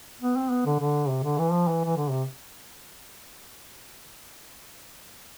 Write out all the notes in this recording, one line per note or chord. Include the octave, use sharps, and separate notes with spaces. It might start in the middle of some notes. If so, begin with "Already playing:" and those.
B3
C4
B3
D3
D3
C3
D3
E3
F3
E3
E3
D3
C3